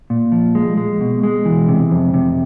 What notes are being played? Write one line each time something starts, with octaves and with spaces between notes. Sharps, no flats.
A#2
F3
G#3
G#3
B2
G#3
E3
C3
F2
C3